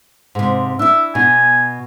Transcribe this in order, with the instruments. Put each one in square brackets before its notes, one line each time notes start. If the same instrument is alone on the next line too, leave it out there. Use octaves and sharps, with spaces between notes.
[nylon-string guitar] G#2 C3
[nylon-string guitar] D4 E4 [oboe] E5
[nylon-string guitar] B2 [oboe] G#5